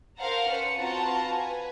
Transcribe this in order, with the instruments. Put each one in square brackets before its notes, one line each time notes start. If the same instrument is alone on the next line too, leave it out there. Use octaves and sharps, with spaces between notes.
[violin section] A#4 C5 F5 F#5 A5 A#5
C#4 B4 C5 C#7
C4 F4 F#4 B4 A5 A#5
B4 G#5